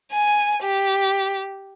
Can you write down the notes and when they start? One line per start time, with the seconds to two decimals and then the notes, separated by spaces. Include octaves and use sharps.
0.12 G#5
0.62 G4